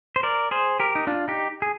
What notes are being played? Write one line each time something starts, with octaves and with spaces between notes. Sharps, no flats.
C5
A#4 D5
G#4 C5
G4 A#4
D#4
D4 F4
D#4 G4
G#4